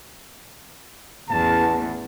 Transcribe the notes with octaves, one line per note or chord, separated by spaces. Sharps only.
A1 E2 A5